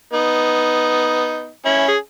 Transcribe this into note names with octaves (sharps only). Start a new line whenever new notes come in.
B3 D#4
C#4 E4
G#4